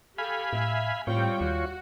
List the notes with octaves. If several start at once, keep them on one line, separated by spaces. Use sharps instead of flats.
G4 A4 F5 G#5 B5
A2 E5
A2 G3 C4 F4 C#5 G5
D#2 F#4